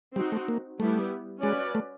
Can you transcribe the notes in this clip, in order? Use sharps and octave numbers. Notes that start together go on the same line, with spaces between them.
G3 C4 D#4 F#4
A3
A#3
G3 A3 B3 E4 G4
G#3 C#4 F#4 B4 D5
A3